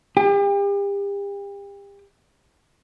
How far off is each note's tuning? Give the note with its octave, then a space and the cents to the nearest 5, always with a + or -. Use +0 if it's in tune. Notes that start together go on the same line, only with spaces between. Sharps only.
G4 +35